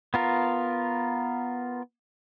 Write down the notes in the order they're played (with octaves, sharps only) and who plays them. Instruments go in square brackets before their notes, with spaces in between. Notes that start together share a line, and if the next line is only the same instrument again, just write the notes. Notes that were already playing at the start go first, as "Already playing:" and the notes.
[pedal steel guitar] B3 F4 A#4